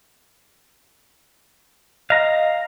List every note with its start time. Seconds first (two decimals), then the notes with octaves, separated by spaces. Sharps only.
2.10 D#5 F5 A#5